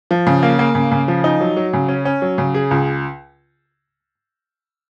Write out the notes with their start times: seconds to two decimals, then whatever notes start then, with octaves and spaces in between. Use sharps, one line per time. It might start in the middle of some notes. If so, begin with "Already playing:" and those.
0.11 F3
0.27 C#3
0.43 A#3
0.59 A#3
0.75 C#3
0.91 C#3
1.08 F3
1.24 D#4
1.41 F#3
1.57 F#3
1.73 C#3
1.88 C#4
2.05 C#4
2.22 F#3
2.38 C#3
2.54 G#4
2.71 C#2